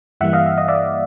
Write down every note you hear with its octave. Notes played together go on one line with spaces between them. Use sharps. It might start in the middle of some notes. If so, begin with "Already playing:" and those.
G2 E3 G3 A#3 E5 F#5
D#5 F5
E5
D#5
D5 E5